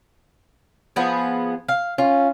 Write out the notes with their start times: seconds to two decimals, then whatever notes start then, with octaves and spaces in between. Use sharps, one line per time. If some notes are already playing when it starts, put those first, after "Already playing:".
0.96 F3 B3 G#4
1.69 F5
1.98 C#4 F4